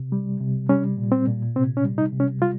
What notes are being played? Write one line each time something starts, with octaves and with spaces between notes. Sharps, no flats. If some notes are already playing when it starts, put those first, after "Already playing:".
Already playing: C3
G3
C3
G3 C#4
A#2
C4
A#2
C3 C4
C#4
G3
D#4
C3
C#4
G3 F4